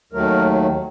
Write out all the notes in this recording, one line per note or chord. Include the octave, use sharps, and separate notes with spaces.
D#2 D#3 F#3 A3 A#4